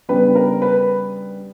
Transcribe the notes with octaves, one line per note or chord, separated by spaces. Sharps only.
C#3 G3 B3 D4 B4
A#4
B4